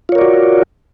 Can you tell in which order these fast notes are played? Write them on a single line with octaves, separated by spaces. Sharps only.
F4 C#5 A#4 D5 F#4